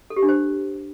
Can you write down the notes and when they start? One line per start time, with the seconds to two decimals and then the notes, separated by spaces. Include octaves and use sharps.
0.10 A4
0.16 G4
0.23 D4
0.29 C5